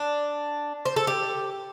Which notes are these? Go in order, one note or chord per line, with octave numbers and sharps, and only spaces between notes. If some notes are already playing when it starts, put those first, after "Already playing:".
Already playing: D4
C5
A4
G4